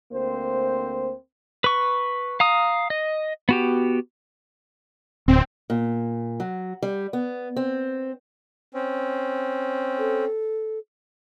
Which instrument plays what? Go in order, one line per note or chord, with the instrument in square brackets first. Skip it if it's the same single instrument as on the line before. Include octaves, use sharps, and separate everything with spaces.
[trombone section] D2 A#3 C4 C5
[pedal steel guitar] B4 C#6
F5 A#5 D#6
D#5
B3 F#4 G4
[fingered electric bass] D1 [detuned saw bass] C4
[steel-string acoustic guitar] A#2
F#3
G3
B3
C4
[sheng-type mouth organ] C4 C#4
[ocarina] A4